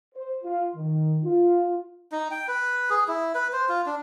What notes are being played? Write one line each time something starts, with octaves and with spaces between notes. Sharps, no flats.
C5
F4
D#3
F4
D#4
G5
B4
G#4
E4
B4
C5
F4
D4